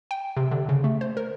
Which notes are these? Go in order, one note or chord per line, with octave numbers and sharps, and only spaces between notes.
G5
C3
D3
C#3
A3
C5
A#4